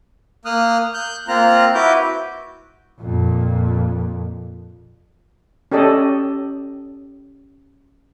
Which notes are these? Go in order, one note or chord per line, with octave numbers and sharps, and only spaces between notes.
A#3 D#6 F6 F#6
F#6 G6
A#3 C4 F4 A#5 F#6
E4 F#4 B4 D6 G6
F2 A#2
C#4 G4 A4 D5 D#5